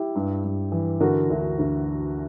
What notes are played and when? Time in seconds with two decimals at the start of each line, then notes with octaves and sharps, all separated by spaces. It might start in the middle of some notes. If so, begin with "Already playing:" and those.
Already playing: E4 G4
0.15 G2
0.44 G2
0.72 E3
1.00 D3 F#4 A#4
1.30 D2
1.59 D2